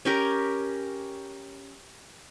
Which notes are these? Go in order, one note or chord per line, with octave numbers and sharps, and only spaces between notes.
C#4 G4 A#4